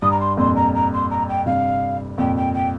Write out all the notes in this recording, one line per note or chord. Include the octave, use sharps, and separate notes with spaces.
G2 D#6
A#5
C6
F2 A#2 C6
A#5
A#5
C6
A#5
G5
G2 C3 F5
F2 A#2 G5
G5
G5